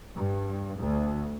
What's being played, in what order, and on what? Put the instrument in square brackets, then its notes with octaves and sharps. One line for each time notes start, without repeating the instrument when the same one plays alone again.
[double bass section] G2
D2